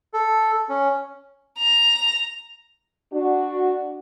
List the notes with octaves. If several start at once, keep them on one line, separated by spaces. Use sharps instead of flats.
A4
C#4
A#5
D4 F#4